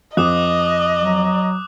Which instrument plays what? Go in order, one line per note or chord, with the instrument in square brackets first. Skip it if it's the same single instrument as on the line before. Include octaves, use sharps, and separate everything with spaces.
[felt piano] F2 [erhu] D#5 [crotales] D6 D#6 F#6
[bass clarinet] F#3